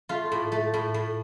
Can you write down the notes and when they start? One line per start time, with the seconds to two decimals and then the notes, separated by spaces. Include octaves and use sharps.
0.09 A3 F4
0.32 A2
0.52 A3
0.74 A2
0.94 A2